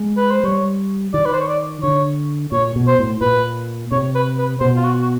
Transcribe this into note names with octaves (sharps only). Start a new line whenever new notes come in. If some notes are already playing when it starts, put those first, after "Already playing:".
Already playing: G#3
B4
C5
G3 C#5
D#3 D5
B4
C5
C#5
D5
D3 C#5
A#2 C#5
B2
C5
A2
A#2 B4
C3 C#5
B4
B4
B2 C5
F4
F#4
F#4